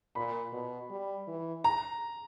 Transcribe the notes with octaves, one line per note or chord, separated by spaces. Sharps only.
A#2 B5
B2
G3
E3
A#5